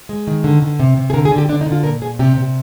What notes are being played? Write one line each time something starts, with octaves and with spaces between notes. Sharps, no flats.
G#3
D#3
D3
D3
C3
C3
G#4
D3 A#4
G#4
D3
G4
D3 D4
D#4
D3
F4
A#2 A#4
A#2 G#4
C3 G4
C3